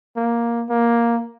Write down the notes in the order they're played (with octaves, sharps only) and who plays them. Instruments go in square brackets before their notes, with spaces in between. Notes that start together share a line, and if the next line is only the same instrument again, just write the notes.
[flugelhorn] A#3
A#3